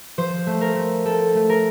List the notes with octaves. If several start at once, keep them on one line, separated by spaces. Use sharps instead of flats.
F3 C5
A3
A#4
A3
C4 A4
A3
A#4